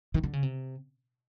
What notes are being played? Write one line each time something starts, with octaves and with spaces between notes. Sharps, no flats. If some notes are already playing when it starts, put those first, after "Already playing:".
D#3
D3
C#3
C3